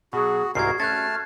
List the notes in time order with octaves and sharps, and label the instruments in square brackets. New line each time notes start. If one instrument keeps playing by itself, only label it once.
[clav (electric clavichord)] B2 F#3 [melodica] F#4 [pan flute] G#4
[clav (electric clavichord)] C2 G#2 C4 [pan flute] F#4 [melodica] A#4 [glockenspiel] G#6 C7
[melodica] A3 A5 [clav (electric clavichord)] C#4 [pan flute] F6 [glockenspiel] F#6 G#6 A6